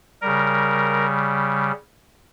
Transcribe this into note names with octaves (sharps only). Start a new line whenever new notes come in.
C#3 G3 A#4